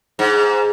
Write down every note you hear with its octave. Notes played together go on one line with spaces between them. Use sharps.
G#2